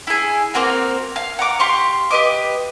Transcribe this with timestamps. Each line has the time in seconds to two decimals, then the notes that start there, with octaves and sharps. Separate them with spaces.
0.07 E4 G#4
0.54 A#3 C4 F#4 F5
1.16 F5
1.39 F#5 A#5 D6
1.60 G4 F5 C6 C#6
2.11 G4 B4 D#5 D6